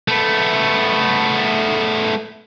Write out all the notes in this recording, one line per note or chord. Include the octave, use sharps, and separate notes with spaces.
A3 B3